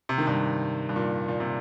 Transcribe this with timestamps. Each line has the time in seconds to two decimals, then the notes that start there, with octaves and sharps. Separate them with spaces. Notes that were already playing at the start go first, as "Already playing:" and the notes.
0.09 C3
0.18 D#3
0.27 G2 C3
0.89 G2
0.96 A#2
1.28 A#2
1.40 C3